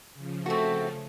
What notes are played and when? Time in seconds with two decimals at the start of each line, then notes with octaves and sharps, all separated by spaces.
0.14 C#3 F3
0.46 A3 C4 F#4